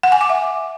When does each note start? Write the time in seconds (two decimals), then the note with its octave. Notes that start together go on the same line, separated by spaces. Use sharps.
0.03 F#5
0.12 G#5
0.21 D6
0.30 E5